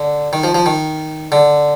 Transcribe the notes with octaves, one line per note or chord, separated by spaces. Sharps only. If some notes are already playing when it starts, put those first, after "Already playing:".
Already playing: D3
D#3
F3
F3
D#3
D3